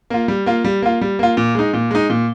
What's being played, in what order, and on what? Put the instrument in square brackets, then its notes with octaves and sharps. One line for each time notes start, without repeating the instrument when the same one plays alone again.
[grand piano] A#3 F4
G3
A#3 F4
G3
A#3 F4
G3
A#3 F4
A#2
G#3 D#4
A#2
G#3 D#4
A#2